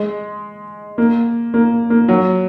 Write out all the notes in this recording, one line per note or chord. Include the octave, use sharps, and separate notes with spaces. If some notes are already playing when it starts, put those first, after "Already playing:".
Already playing: G#3
A#3
A#3
A#3
F#3